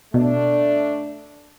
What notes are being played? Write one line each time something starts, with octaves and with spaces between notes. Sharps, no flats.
B2 A3 D4